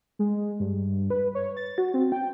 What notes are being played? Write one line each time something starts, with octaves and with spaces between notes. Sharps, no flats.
G#3
G2
B4
C#5
A6
F#4
C4
G5